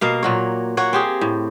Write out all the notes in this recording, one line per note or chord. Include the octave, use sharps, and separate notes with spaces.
B2 A#3 F5
A#2 F#3 C#5
A#3 C#5 F#5
C4 G4 G#4
A2